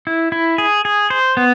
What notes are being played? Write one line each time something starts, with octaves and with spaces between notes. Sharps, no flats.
E4
E4
G#4
G#4
C5
B3